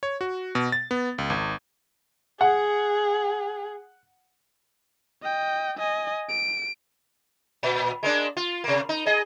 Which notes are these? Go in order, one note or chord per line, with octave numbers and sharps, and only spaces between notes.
C#5
F#4
B2
A6
B3
C#2
G#1
G#4 F#5
D#5 G5
D#5 G#5
D7
A#2
G#3 A#3 D4
F4
C3 A#3
D#4
G#4 D#5